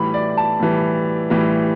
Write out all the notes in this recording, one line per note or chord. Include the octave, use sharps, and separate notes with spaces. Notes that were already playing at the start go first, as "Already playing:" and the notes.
Already playing: A2 E3 G3 B5
D5
A5
A2 E3 G3
A2 E3 G3